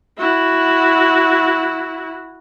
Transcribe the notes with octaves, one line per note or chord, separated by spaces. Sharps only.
E4 F#4